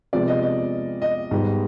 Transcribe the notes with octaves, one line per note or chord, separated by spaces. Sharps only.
C3 F3 G#3 B3 D5
D#5
D#5
D#5
G#2 G3 B3